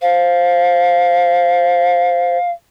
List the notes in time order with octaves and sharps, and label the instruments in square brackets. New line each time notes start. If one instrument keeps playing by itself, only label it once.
[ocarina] C5 [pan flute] F5